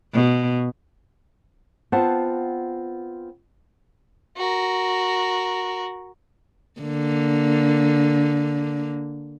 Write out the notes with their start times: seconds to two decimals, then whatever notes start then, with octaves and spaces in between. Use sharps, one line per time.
0.13 B2
1.92 B3 C4 F4 C5 F#5 A5
4.36 F#4 A#4
6.81 D3 A#3